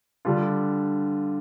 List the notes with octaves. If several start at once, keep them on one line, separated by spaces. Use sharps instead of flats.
D3 G3 D4 F4